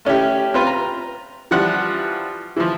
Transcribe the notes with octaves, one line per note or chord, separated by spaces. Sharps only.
A3 C#4 E4 G4
C4 F4 B4
A#5
E3 F3 G3 F#5
E3 F3